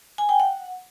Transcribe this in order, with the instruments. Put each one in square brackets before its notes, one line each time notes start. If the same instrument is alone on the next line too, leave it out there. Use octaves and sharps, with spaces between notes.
[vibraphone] G#5
G5
F#5